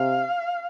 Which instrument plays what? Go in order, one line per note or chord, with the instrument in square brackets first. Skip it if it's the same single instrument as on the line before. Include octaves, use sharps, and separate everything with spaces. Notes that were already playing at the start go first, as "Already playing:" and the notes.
Already playing: [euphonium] C3 [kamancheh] F5